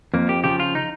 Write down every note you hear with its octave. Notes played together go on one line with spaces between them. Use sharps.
F2 A#3
G4
C#3 F3 G4
F4
D#4